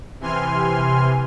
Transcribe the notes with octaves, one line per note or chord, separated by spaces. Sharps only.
C3 E3 G#5 C6 F6